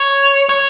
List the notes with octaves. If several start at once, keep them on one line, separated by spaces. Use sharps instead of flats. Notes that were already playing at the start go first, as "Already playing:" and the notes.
Already playing: C#5
C#5